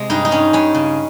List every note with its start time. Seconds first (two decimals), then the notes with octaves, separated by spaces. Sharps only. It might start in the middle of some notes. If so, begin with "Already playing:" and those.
Already playing: C3 G#3
0.10 G2 D#4
0.25 D#4
0.31 G2 C#4
0.53 G2 C#4
0.75 C#3